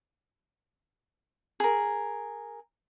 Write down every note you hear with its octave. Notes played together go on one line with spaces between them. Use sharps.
G#4 A#4